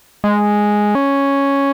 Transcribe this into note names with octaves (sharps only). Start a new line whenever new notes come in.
G#3
C#4